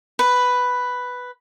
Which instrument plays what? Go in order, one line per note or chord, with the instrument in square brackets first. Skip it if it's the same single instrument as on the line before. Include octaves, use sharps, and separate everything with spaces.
[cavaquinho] B4